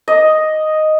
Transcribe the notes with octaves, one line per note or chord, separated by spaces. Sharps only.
D#5